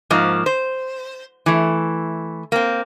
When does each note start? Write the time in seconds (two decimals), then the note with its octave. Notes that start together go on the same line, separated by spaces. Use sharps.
0.10 G#2 F3 A#3
0.46 C5
1.46 E3 A3
2.52 A#3 C4